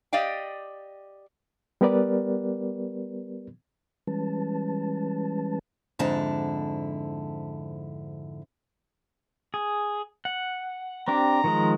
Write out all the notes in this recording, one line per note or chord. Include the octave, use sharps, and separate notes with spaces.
G4 D5 D#5 F5 G5
G3 B3 G4 A#4 B4 D5
E3 G3 G#3 C#4 B4 A5
F2 G#2 D3 E4 A5
G#4
F#5
C4 D4 G4 A#5
D#3 F3 G#3